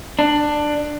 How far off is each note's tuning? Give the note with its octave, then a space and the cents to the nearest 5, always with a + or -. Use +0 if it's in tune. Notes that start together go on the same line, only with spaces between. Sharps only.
D4 +15